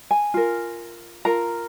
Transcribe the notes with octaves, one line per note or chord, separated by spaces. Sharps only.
G#5
F4 A#4
F4 A#4 A#5